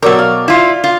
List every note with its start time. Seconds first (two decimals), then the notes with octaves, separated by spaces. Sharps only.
0.02 B2 F#3 A#4 D5 E6
0.19 F5
0.48 E4 F4
0.84 F4